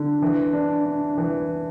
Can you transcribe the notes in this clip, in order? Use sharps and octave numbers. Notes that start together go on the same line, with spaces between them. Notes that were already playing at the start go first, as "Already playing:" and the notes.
Already playing: D3
E3
D4
D4
E3